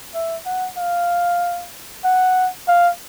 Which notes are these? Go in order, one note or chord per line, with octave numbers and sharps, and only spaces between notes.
E5
F#5
F5
F#5
F5